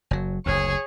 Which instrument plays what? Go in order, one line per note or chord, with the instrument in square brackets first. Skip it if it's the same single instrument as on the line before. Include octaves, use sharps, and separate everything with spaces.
[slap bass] F#1 F#3
[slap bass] F#1 D2 [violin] G#4 C#5